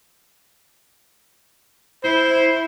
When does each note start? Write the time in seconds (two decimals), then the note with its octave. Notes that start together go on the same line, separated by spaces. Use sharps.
2.04 E4 C5